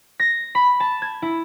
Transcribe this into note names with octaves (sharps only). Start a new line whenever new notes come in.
A#6
B5
A5
G#6
E4